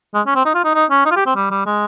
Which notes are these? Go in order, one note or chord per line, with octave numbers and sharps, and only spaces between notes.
G#3
C#4
C4
D#4
F4
D#4
D#4
C#4
D#4
F4
G4
C4
G3
G3
G#3